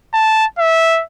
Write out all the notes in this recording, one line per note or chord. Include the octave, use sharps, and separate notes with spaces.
A5
E5